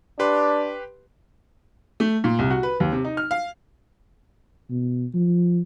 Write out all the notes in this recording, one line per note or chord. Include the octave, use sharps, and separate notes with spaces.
D4 G4 B4 C6
A3
A#2
C2
F#4
B4
D#2
C3
D#4
F6
F5
B2
F3